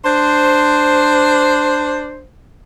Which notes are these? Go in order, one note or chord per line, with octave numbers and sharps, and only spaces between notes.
D4 C5